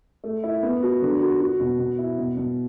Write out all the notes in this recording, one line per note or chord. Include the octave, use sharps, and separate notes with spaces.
A3
E4
B3
F#4
D3
F#4
F#4
B2
B2
E4
B2
B2